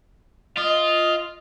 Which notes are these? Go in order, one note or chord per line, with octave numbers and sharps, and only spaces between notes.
F4 D#5